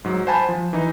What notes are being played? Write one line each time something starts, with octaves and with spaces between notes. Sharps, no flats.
G#2 F#3
C5 F#5 G#5 A5 B5
F3
E3 D#4